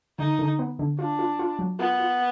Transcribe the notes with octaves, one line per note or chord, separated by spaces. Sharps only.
D3 D#4
D3
B3
D3
D4 F4
F4
F4
F#3
B3 F4
F4